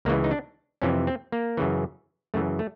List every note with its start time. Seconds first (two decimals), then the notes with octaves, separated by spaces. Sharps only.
0.05 C#2 C#3 E3 A#3
0.24 D#4
0.31 D4
0.82 F2 C3 E3 C#4
1.07 C4
1.32 A#3
1.57 F#2 C#3 E3
2.34 F#2 C#3 E3 A3
2.59 A3